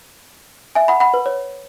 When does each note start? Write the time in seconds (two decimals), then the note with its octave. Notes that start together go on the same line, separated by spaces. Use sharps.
0.75 E5 G#5
0.88 F#5 B5
1.00 F#5 B5
1.14 B4
1.26 C#5